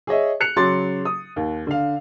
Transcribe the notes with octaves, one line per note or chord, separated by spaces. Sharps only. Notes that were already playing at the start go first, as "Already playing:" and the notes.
G#4 C#5 D#5 E5
F#6 C#7 F7
C#3 F#3 C6 D6 A6
D#6
D#2
D3 F5